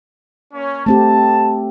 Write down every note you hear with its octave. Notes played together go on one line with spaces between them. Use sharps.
A#3 C#4 C#5
A3 C4 G4 A5